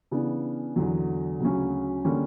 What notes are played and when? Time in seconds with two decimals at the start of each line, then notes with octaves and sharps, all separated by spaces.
0.11 C#3 E3 B3 D4
0.76 E2 D3 F#3
1.40 D2 C#3 F#3 C#4
2.05 D3 G3 A#3 C#4